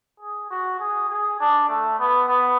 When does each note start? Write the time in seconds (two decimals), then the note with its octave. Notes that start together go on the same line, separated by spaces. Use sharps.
0.20 G#4
0.50 F#4
0.80 G#4
1.09 G#4
1.40 D4
1.68 A3
1.99 B3
2.28 B3